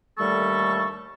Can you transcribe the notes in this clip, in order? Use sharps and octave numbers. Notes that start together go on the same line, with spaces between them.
D#2 D3 G3 A3 A4 C#6